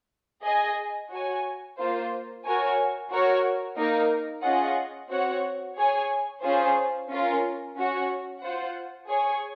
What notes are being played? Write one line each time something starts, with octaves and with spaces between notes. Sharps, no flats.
G#4 D#5 G#5
F#4 C#5 G#5
A#3 F4 C5
F#4 A#4 C#5 G#5
F#4 A#4 C#5
A#3 D#4 A#4
C#4 F4 G#4 D#5 F#5
C4 F#4 C#5 F#5
G#4 C#5 G#5
C#4 F4 G#4 C5
C#4 F4 A#4
C#4 F#4 C#5 F#5
F4 C5 F#5
G#4 C#5 G#5